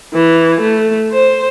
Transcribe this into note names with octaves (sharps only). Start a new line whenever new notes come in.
E3
A3
C5